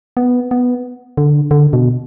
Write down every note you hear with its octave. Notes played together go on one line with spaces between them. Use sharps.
B3
B3
D3
D3
B2